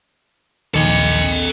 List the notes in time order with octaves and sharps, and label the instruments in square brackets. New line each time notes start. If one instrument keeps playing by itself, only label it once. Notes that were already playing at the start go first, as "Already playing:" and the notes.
[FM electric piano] A#1 D#2 C#7 [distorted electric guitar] A4 D#5